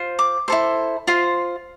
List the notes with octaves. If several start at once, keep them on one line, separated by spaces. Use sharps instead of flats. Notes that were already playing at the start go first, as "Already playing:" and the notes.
Already playing: F4 C5
D6
E4 A4 C5
F4 C5